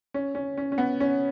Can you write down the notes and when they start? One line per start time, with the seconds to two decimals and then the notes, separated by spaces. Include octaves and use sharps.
0.14 C#4
0.35 C#4
0.58 C#4
0.72 C#4
0.78 B3
1.00 C#4